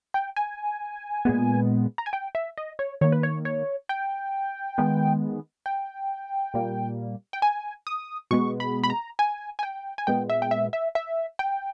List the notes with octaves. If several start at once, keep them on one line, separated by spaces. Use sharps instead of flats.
G5
G#5
A#2 G#3 B3
A#5
G#5
G5
E5
D#5
C#5
D#3 A#3 C#5
B4
C#5
C#5
G5
D#3 G#3 B3
G5
A#2 G3 A#3
G5
G#5
D#6
B2 G#3 B3 C#6
B5
B5
A#5
G#5
G#5
G5
G#5
A#2 G#3 B3 G5
E5
G5
E5
E5
E5
G5